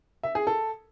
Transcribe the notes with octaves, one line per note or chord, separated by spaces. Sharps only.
E5
G#4
A4